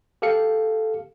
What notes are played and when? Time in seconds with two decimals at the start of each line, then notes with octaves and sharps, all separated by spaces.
0.22 G4 A4 F5 C#7